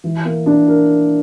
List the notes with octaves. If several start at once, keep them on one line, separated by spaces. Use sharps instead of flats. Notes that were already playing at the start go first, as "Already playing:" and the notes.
E3
A#3
D4
A#4